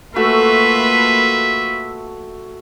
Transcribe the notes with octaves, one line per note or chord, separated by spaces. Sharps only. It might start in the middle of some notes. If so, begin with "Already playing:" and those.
A3 A#3 F4 F#4 A4 B4 E5